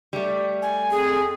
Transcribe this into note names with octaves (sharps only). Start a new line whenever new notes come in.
G3 A3
G#5
F2 G#4